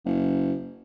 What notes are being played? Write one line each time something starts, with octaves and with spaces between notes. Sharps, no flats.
F#1